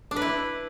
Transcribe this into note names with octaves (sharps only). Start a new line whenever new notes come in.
D4
B4
E4